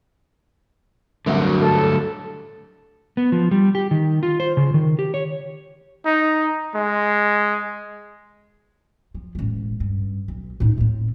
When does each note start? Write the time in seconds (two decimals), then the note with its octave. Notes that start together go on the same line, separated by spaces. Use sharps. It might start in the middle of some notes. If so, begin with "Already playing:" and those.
1.26 F#1 C2 D3 F#3 A3 F#4
1.61 G2 A4
3.17 B3
3.32 F3
3.51 G3
3.75 G4
3.91 D#3
4.23 F4
4.40 C5
4.57 C#3
4.74 D#3
4.99 G4
5.14 C#5
6.06 D#4
6.75 G#3
9.15 F3
9.35 E1 A1
9.80 G2
10.28 B1
10.60 A2 D#4
10.78 A2 C4